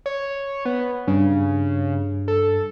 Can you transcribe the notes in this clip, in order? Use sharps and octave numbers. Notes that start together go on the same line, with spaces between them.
C#5
B3
G2 C#3
A4